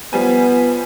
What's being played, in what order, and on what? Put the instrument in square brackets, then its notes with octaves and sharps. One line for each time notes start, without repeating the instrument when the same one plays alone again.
[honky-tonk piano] F3 G3 G#5 [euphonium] B3